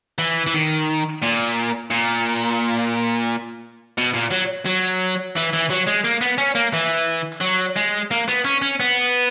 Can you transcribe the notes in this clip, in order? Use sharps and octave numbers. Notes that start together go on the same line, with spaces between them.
E3
E3
D#3
A#2
A#2
B2
A#2
F#3
F#3
E3
E3
F#3
G#3
A#3
B3
C#4
A#3
E3
F#3
G#3
A#3
B3
C#4
C#4
B3